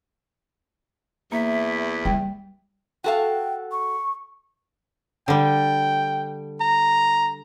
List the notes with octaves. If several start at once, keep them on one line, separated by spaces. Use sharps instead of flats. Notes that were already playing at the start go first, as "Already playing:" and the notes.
E2 A#3 E5
G3 G5
F#4 A4 F5 G5
C#6
D3 G3 G5
A#5